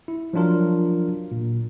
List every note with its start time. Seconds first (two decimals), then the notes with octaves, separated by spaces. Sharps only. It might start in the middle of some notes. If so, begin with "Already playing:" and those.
0.08 E4
0.33 F3 F#3 D4 F4 A#4
1.31 A#2